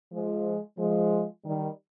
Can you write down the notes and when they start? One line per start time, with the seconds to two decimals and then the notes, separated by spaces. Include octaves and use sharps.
0.12 F3 G#3
0.78 F3 G#3
1.44 D#3 G3